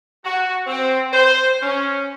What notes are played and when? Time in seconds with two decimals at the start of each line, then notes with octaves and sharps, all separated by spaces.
0.24 F#4
0.67 C4
1.12 C5
1.62 C#4